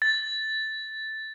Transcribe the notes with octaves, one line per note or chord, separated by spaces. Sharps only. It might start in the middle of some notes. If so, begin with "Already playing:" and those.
A6